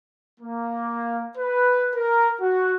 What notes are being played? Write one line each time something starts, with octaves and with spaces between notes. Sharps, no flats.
A#3
B4
A#4
F#4